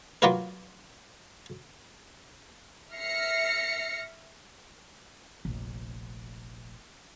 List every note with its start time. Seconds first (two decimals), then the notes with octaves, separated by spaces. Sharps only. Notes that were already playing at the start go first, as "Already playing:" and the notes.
0.22 F#3 A#3 F4 F#4 A#4 B4
2.93 E5 F6 A#6 C7 C#7
5.45 F1 A#1